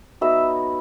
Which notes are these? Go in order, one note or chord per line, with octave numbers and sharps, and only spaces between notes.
F#3 B3 D#4 E5